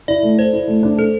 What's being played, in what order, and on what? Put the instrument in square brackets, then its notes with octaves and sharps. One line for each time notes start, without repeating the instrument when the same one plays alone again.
[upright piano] E4 [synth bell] D5
[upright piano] A3
[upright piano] A4 [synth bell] C5
[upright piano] E4
A3
D4
[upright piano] D4 [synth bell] A4